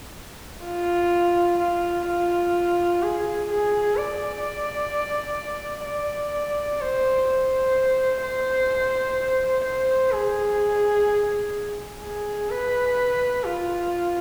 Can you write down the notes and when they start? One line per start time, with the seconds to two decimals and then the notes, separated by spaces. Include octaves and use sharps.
0.65 F4
1.59 F4
2.08 F4
3.02 G#4
3.49 G#4
3.97 D5
5.86 D5
6.81 C5
7.29 C5
8.23 C5
9.65 C5
10.12 G#4
12.02 G#4
12.50 B4
13.44 F4